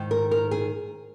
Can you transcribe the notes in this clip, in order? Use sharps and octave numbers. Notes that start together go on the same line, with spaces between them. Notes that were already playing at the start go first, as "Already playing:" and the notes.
Already playing: G#2 D#3
A#4
A#4
G#4